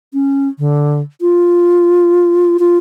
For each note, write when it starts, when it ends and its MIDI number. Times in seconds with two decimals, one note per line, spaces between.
0.13 0.48 61
0.59 1.00 50
1.21 2.57 65
2.59 2.78 65